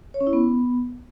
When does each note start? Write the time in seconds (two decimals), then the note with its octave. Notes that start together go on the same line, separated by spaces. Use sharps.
0.14 C#5
0.20 C#4
0.27 E4
0.33 B3